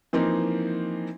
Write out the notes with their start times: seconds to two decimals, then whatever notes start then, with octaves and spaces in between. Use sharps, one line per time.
0.13 E3 F3 A#3 C4 D#4